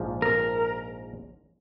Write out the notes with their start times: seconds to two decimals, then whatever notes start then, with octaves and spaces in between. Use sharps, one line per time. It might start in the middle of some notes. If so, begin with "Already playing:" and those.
Already playing: A#1 G#2 F3
0.22 A#4